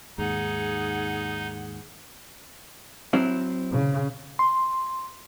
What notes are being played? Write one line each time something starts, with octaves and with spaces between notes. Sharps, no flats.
D#2 G#2 D#4 G#4 F#5
F#3 C4 E4
C#3
C6